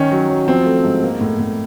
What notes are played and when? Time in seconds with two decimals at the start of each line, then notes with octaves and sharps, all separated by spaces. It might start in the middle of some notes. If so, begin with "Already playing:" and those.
Already playing: D#3 C#4
0.12 F#3
0.30 F#3
0.48 F3 C4
0.66 A3
0.84 G#2
1.03 A#3
1.21 A2
1.39 A2